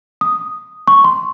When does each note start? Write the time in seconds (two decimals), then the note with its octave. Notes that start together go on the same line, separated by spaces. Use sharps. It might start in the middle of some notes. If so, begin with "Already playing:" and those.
0.21 D#6
0.88 C#6
1.04 C6